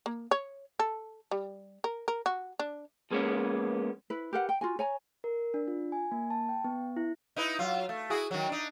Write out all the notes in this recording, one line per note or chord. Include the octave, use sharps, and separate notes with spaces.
A#3
C#5
A4
G3
A#4
A#4
F#4
D4
F3 G#3 A#3 B3 C#4
E4 B4
G4 A#4 B4 F#5
G5
F4 F#4 G#5
C#5 G#5 A#5
A#4
D4
F4
G#5
A#3
A5
G5
B3
E4
D#4 E4 B4
F#3 F4
A3
E4 F#4 G#4
D#3 F#3
D4 D#4